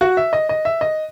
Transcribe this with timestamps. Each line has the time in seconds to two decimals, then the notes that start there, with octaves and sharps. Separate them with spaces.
0.01 F#4
0.17 E5
0.33 D#5
0.49 D#5
0.65 E5
0.81 D#5